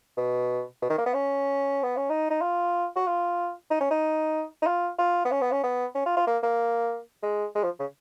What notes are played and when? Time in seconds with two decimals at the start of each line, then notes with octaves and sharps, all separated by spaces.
0.17 B2
0.82 B2
0.90 D#3
0.98 A#3
1.06 B3
1.14 C#4
1.83 B3
1.97 C#4
2.10 D#4
2.30 D#4
2.42 F4
2.96 F#4
3.07 F4
3.71 D#4
3.81 C#4
3.91 D#4
4.62 D#4
4.67 F4
4.99 F4
5.25 B3
5.32 C#4
5.42 B3
5.52 C#4
5.64 B3
5.95 C#4
6.06 F4
6.17 F4
6.27 A#3
6.43 A#3
7.23 G#3
7.55 G#3
7.64 F3
7.80 C#3